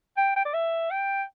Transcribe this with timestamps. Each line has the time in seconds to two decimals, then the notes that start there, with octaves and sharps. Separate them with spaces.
0.17 G5
0.36 G5
0.45 D5
0.54 E5
0.91 G5